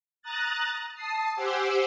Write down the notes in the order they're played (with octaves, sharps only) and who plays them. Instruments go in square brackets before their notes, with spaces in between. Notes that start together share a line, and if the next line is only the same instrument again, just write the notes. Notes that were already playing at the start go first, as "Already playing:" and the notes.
[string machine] A#5 D#6 F#6 A6
A5 D#6 C7
G4 C5 F#5 G#5 D6 E6